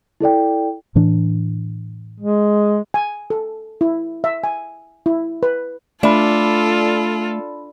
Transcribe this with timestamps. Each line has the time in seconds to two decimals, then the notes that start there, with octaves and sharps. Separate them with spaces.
0.20 E4 A4 D5 G5
0.95 A2 E3 D4
2.20 G#3
2.94 G#5
3.30 A4
3.81 E4
4.24 E5
4.44 G#5
5.06 E4
5.43 B4
6.03 A3 D4 F4 A4 D5 B5